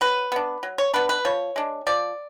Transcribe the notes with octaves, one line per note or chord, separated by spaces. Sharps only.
F#3 B4
B3 D4
F#3
C#5
B3 D4 B4
B4
F3 C#5
G#3 D4
F3 D5